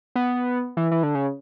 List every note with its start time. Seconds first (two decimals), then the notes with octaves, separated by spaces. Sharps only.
0.16 B3
0.77 E3
0.91 E3
1.03 D3
1.15 C#3